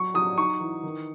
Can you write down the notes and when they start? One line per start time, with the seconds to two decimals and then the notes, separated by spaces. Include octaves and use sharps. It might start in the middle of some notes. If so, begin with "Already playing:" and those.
Already playing: F#3 C#6
0.14 F#3 D#6
0.37 D#4 C#6
0.60 E3
0.83 D#3